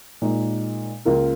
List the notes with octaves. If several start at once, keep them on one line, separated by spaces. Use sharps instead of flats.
A#2 G#3 D#4
C#2 C#3 A#3 F4 A#4